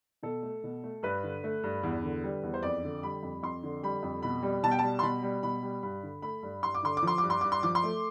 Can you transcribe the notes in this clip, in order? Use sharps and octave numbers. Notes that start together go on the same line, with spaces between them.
B2 A4
A3
B2
A3
G2 B4
D3
A3
G2
E2
D3
G3
E2
C5
F2 D5
D3
G3 B5
F2
F2 C6
D3
G3 B5
F2
B2 B5
G3
B2 A5
G5
G3 A5
C6
B2 B5
G3
B2 B5
G3
G2 B5
D3
A3 B5
G2
G2 C6
D6
D3 C6
D6
F3 C6
G2 D6
C6
G2 D6
C6
F3 D6
C6
A3